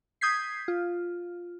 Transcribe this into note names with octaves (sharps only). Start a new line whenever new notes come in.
D#6 G6 G#6 B6 C7
F4